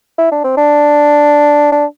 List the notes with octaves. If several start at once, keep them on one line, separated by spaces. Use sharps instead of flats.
E4
D4
C4
D4
D4